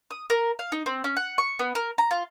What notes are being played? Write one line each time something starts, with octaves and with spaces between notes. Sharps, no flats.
D#6
A#4
F5
D#4
C4
C#4
F#5
C#6
B3
A#4
A#5
F4